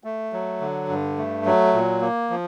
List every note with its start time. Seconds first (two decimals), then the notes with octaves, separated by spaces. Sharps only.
0.04 A3
0.33 F#3
0.61 D3
0.89 G2
1.17 A3
1.46 F#3
1.74 A#2
2.01 A#3
2.30 F3